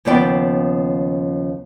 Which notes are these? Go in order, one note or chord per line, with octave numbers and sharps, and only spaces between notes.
D#2 C#3 F3 B3 D5 G5